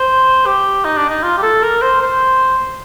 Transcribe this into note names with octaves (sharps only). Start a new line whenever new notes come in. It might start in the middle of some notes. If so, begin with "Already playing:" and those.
Already playing: C5
G4
D#4
D4
D#4
F4
G4
A4
A#4
C5
C5